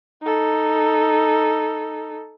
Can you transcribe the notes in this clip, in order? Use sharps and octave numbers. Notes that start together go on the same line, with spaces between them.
D#4 A4